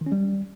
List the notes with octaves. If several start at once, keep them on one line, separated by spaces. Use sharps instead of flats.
D#3
C#4
G3